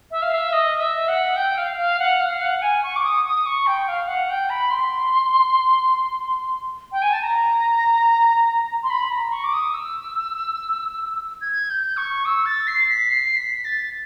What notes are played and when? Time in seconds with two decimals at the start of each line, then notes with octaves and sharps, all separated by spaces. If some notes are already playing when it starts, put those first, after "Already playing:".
0.11 E5
0.22 F5
0.34 E5
0.53 D#5
0.81 E5
1.08 F#5
1.36 G5
1.58 F5
1.78 F5
1.99 F#5
2.20 F5
2.41 F#5
2.62 G#5
2.83 C#6
2.96 D6
3.04 D#6
3.25 D#6
3.46 C#6
3.67 G5
3.88 F5
4.08 F#5
4.30 G5
4.50 B5
4.71 C6
6.92 G5
7.02 G#5
7.13 A5
7.22 A#5
8.83 C6
8.90 B5
9.11 A#5
9.32 C#6
9.44 D6
9.53 D#6
9.74 E6
11.41 G#6
11.70 G6
11.97 C#6
12.25 E6
12.46 A6
12.67 C7
12.89 B6
13.09 C7
13.36 B6
13.65 A6